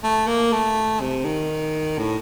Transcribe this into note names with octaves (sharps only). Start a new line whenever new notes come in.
A3
A#3
A3
C3
D#3
A2